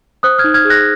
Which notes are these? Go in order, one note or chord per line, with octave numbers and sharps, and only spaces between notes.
C5 D#6 F#6
F6 G#6
D#4
F6 G#6
G#4
F#6 A#6